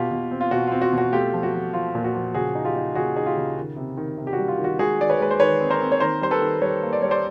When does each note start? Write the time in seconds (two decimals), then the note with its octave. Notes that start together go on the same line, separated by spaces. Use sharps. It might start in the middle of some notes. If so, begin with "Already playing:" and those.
Already playing: B2 F4 G4
0.11 B2
0.31 C4
0.41 F4
0.51 B2 F#4
0.67 F4
0.72 C4
0.82 F#4
0.92 B2
0.98 F#4
1.13 A3 F4 G4
1.34 F3
1.43 F#4
1.53 F3
1.74 F3 F4
1.95 A#2
2.04 F#4
2.15 F3
2.34 C#3 F#4 G#4
2.55 D#4
2.65 F4 G4
2.76 D#4
2.95 C#3 F#4 G#4
3.16 D#4 G#4
3.26 F4 G4
3.37 C#3
3.56 D#3
3.77 C3
3.97 D#3
4.18 C3
4.27 G4
4.33 F#4
4.38 G3
4.48 F4
4.58 D#3
4.64 F#4
4.79 G#3 F#4 G#4
4.99 D#3 D5
5.10 B4 C#5
5.20 G#3 B4
5.31 C5
5.40 D#3 B4 C#5
5.60 C4
5.70 A#4 C5
5.81 C4
5.92 C#5
6.00 D#3 A#4 C5
6.21 G3 C5
6.31 A4 B4
6.42 D#3
6.62 G3 B4 C#5
6.83 A#3
6.93 D5
7.02 G3 C#5
7.11 C5 D5